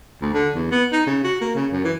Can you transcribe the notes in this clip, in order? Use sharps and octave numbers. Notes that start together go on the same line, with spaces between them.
D2
D3
E2
B3
D#4
C#3
F#4
A#3
C#3
F#2
E3